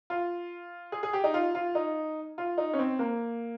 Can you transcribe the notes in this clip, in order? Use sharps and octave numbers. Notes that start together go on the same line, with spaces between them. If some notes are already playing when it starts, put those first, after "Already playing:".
F4
G#4
G#4
G4
D#4
F4
F4
D#4
F4
D#4
C#4
C4
A#3